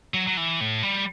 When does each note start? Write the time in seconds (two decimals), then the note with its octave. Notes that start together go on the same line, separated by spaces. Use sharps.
0.14 F#3
0.27 F#3
0.37 E3
0.61 A2
0.83 G3